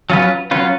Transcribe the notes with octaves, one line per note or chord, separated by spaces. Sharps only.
F#3 C#4 F4 B4
F#3 C#4 F4 B4